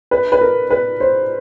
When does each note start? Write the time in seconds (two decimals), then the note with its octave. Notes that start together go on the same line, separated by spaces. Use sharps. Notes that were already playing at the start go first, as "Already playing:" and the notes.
0.11 B4
0.32 B4
0.41 A#4
0.70 B4
1.00 C5